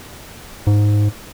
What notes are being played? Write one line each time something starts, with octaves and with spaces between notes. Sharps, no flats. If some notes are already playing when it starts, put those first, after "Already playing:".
G#2